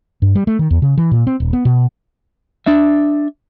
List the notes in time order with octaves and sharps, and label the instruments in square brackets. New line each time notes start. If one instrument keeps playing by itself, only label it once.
[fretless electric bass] G2
G3
A3
D#3
E2
C#3
E3
A#2
C4
D#1
B3
B2
[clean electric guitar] D4 E5